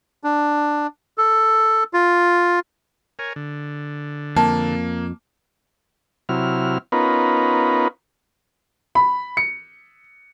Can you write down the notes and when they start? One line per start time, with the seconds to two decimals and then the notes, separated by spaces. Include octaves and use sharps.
0.24 D4
1.18 A4
1.93 F4
3.19 A#4 C#5 G#5
3.36 D3
4.37 F2 A#3 A5
6.29 C3 F#3 E4 F6
6.92 B3 C#4 D#4 F4 A#4 B4
8.95 B5
9.37 C#7